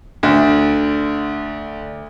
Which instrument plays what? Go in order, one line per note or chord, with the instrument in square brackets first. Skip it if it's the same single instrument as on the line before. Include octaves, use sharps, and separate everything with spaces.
[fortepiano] D2 [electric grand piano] D3 D5